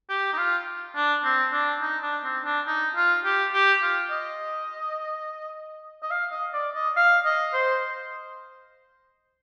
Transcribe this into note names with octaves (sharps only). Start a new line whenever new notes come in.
G4
D#4
F4
D4
C4
D4
D#4
D4
C4
D4
D#4
F4
G4
G4
F4
D#5
D#5
F5
D#5
D5
D#5
F5
D#5
C5